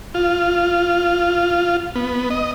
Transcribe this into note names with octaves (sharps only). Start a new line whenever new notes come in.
F4
B3
D#5